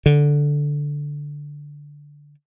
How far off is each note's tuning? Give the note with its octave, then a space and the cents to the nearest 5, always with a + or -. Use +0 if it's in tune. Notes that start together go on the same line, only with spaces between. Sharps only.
D3 -5